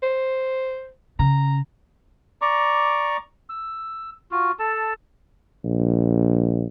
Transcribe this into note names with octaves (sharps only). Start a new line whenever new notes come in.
C5
C#3 A#5
D5 A#5 C#6 D6
E6
F4 F#4
A4 A5
A#1